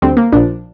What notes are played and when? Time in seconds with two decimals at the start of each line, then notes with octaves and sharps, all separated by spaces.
0.02 D2 D3 G3 C4
0.17 A#3
0.32 A#1 A#2 F3 D4